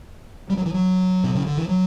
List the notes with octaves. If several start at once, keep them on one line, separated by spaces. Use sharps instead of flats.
G3
F#3
E3
F#3
B2
C#3
D3
E3
F#3